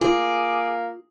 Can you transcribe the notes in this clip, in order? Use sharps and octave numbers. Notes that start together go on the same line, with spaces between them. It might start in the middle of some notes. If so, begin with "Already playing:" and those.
A#3 F4 G#4 D6